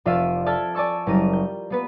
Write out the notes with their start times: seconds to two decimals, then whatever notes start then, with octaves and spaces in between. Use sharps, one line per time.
0.06 F1 F4 D5 E5 F5 D#7
0.46 A4 D5 E5 A5 F6 G#6
0.75 D5 G#5 A5 C#6 E6
1.07 F#1 G3 G4 A#4 D#7
1.33 G6
1.70 A#3 B3 B4